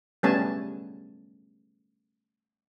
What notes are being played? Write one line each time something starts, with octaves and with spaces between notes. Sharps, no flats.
G3 A3 B3 C#4 G#5 A5